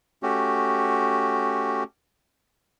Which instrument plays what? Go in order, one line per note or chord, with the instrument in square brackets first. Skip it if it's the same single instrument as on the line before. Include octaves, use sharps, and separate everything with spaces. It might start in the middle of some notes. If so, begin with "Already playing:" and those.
[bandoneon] A3 C#4 F#4 G4